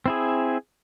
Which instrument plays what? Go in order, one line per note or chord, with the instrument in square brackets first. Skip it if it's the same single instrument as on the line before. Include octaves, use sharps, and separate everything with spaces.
[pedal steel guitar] C4 E4 G#4